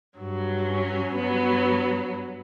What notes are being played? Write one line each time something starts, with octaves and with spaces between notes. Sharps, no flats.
G2 F#3
C#4
G2 F#3 B3